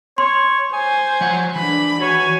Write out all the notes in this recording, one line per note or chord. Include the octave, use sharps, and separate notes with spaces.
C#5 C6
C5 G#5
F3 C#5 F#5
E3 D4 B5
F#4 C#5 G#5